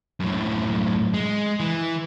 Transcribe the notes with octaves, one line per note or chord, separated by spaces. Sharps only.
F#2 A2
G#3
E3